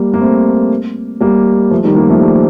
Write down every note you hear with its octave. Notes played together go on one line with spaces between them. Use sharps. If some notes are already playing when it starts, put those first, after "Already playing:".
Already playing: G3 A#3
A#3
A3 C4
G3 A#3
F3 A3
D#3 G3
G3 A#3
F3 A3
G3 A#3